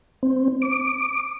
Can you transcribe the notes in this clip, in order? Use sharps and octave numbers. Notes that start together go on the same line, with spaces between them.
C4
D6